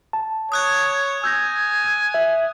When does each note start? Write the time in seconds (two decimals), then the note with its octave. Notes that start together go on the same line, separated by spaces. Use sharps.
0.13 A5
0.52 C#5 D#6 F#6 G#6
1.24 G#5 E6 G6 A#6
2.14 E5